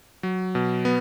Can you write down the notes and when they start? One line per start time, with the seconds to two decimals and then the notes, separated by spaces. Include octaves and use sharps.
0.23 F#3
0.55 B2
0.85 B3